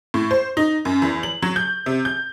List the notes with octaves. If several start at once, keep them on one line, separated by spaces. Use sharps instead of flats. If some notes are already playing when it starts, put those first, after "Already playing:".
A2
C5
D#4
F#2
E2
F#7
F#3
G6
C3
G6